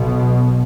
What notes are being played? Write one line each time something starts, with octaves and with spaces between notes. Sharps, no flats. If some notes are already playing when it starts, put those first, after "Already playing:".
Already playing: B1 B2